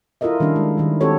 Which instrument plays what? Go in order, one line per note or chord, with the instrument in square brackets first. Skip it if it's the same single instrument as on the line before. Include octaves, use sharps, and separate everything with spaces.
[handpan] E4 F4 A4 A#4 D#5 E5
D#3 G3 C#4 D4
G#3
D#3 G3
C4 F#4 G4 A4 C#5